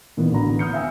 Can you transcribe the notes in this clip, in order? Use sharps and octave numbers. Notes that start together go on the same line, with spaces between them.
A#2 D#3 E3 B3
A1 D3 B3 F#4 A#5 B5
D#6 F6 G6 C#7
E5 F5 G5 G#5 A#5 E6